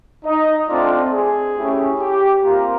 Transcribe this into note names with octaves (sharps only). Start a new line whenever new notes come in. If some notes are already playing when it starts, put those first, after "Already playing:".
D#4 D#5
A3 C4 D4 F4 D5
G#4
A3 C#4 E4 G4
G4
A#3 C4 F4 A#4